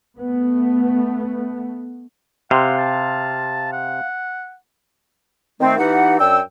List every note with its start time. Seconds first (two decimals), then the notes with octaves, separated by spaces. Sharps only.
0.18 A3 B3
2.51 C3 F5 F#5 C6
2.78 A5
3.73 F#5
5.61 D#3 A3 C4
5.78 E3 B3 D#4 G4 F#5
6.20 F#2 D4 G5 E6